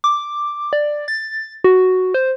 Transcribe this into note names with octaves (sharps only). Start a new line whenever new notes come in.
D6
D5
A6
F#4
C5